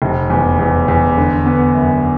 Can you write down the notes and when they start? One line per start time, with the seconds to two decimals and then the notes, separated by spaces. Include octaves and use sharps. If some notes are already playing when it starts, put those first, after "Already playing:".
0.02 F1
0.30 E2
0.59 E2
0.88 E2
1.17 D3
1.46 B3
1.75 F#2